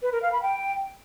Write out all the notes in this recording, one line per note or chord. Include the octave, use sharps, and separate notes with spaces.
B4
A#4
F5
B5
G5